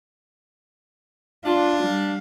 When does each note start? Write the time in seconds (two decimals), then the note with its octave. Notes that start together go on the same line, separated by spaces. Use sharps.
1.45 D4 F4
1.82 G3 F5